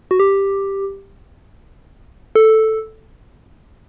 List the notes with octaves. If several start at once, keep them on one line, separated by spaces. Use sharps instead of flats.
F#4
G4
A4